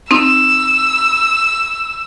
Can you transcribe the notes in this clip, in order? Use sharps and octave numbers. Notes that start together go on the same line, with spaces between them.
C4 D#4 E6